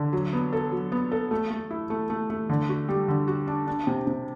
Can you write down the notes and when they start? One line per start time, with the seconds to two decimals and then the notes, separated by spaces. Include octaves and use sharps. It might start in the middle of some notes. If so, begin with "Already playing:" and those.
Already playing: D3
0.13 F#3
0.33 B3
0.53 A4
0.72 F#3
0.92 B3
1.12 A4
1.31 A3
1.50 A3
1.71 E4
1.90 A3
2.10 A3
2.30 A3
2.49 D3
2.69 F#4
2.89 G3
3.08 D3
3.27 F#4
3.47 D4
3.67 D4
3.87 C3
4.07 C3